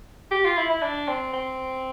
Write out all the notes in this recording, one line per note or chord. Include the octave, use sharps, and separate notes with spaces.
G4
F4
E4
E4
D4
C4
C4